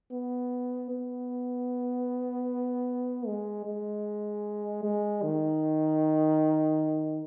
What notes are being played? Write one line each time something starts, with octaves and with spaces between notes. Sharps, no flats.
B3
B3
G#3
G#3
G#3
D#3